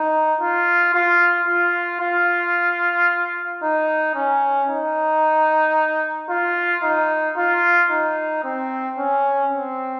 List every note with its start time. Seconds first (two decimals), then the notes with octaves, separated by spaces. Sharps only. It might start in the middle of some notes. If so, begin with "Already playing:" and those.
Already playing: D#4
0.41 F4
0.94 F4
1.48 F4
2.01 F4
3.63 D#4
4.15 C#4
4.70 D#4
6.30 F4
6.83 D#4
7.37 F4
7.91 D#4
8.44 C4
8.98 C#4
9.52 C4